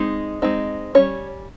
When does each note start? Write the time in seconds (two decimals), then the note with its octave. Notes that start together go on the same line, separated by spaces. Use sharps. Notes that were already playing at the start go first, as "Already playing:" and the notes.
Already playing: G#3 C4 D#4
0.42 G#3 C4 D#4
0.95 G3 C#4 C#5